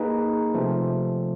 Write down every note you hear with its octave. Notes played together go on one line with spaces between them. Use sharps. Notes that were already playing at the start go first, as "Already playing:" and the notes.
Already playing: A#3 D#4 G#4 B4
C3 F3 A3